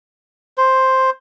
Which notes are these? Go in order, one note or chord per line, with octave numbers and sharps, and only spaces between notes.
C5